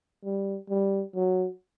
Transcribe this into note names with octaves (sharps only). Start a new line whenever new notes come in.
G3
G3
F#3